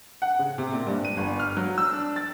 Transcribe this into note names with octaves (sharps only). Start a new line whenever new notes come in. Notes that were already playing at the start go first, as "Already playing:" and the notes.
F#5
C#3
C3
A#2
G2
D#7
G1
F6
F#3
E6
D4
A6